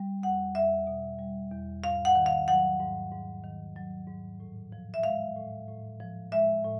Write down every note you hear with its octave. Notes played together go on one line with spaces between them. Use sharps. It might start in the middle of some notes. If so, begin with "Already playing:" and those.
Already playing: G3
E2 F#5
E2 E5
B2
G3
E2
G#2 F5
F#5
D#3
F5
F#3 F#5
G#2
G#2
D#3
F#3
G#2
A2
F3
E5
G#3 F5
A2
A2
F3
G#3 E5
A2